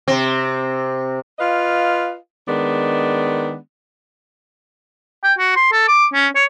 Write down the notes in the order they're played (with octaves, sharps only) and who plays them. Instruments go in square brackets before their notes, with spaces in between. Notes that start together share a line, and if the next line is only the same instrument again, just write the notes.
[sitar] C3 C4
[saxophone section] F4 B4 D#5 F5
D#3 G#3 B3 D4
[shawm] G5
F#4
C6
A4
D6
C#4
C#5